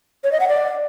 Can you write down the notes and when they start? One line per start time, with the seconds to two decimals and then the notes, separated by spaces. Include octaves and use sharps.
0.24 C#5
0.32 D#5
0.40 F#5
0.48 D5